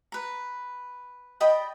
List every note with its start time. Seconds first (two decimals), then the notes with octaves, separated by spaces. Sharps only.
0.12 B4 A#5
1.40 D5 D#5 G5 B5